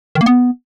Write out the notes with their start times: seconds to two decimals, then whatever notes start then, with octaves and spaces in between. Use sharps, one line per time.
0.15 D#3
0.21 A#3
0.26 B3